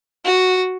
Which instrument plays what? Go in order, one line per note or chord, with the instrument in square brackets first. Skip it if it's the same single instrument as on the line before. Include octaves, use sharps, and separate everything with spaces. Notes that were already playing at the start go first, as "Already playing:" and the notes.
[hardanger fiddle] F#4